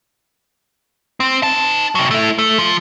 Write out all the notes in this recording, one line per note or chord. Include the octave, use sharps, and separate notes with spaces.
C4
D#4 A5
C3 F#3
A3 E4
A3
F3